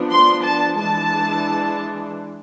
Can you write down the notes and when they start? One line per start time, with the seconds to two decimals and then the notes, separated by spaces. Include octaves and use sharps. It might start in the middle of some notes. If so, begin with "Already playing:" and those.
Already playing: F3 B3 D4
0.10 C6
0.44 A5
0.79 E3 G#3 D4 A5